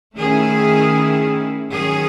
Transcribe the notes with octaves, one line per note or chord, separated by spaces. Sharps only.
D#3 A3 C#4 E4 G#4
D#3 F#3 C#4 G#4